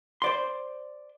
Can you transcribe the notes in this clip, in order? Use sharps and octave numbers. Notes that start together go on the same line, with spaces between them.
C5 D5 C6